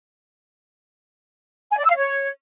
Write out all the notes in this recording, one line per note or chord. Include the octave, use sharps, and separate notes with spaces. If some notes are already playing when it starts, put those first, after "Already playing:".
G#5
D5
E6
F5
C#5